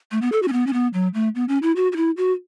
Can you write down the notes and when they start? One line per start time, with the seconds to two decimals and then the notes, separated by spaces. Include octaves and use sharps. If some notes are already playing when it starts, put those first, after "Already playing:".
0.11 A3
0.22 B3
0.32 A4
0.43 F#4
0.48 C#4
0.53 B3
0.67 C#4
0.73 B3
0.94 F#3
1.14 A3
1.35 B3
1.49 C#4
1.62 E4
1.76 F#4
1.92 F#4
1.96 E4
2.17 F#4